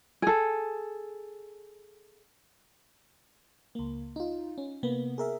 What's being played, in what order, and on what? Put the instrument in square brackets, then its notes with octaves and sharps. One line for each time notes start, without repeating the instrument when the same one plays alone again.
[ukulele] G#4 A4
[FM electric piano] C#2 A#3
D#4 F4
C#4
C3 A#3 B3
G#4 A#4 E5